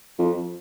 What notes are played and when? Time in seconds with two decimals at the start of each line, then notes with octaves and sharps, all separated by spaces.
0.19 F2